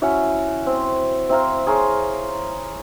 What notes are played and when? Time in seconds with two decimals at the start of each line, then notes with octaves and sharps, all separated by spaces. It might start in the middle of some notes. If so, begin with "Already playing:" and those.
0.02 C#4 E4 F#4
0.66 C4
1.29 C4 E4 A#4 F5
1.67 G#4 A#4 C5 C#5